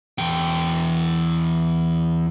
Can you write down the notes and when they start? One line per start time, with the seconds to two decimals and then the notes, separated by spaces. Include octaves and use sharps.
0.18 E2 G5